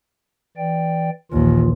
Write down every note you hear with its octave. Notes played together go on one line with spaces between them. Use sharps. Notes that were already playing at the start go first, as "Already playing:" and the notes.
E3 D5 G5
A#1 D#2 D#3 E3 F4